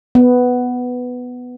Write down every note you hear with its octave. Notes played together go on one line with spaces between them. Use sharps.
B3